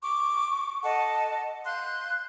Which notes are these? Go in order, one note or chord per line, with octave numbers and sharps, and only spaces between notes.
C#6 D6
A4 D#5 F#5 A5
F5 C6 F#6 G6